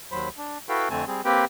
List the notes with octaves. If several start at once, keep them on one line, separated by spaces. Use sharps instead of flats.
D#2 F#3 C5 B5
D4
E4 F#4 A4 B4 F5 G5
F2 D3 A3 C4 G#5 A5
G3 C4 G#4
A#3 C4 G4 B4 G5